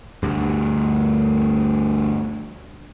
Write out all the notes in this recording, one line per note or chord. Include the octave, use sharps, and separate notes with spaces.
D2 G2